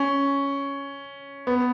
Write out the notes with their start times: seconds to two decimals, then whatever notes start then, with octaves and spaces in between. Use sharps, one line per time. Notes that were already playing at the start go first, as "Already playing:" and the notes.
Already playing: C#4
1.47 B3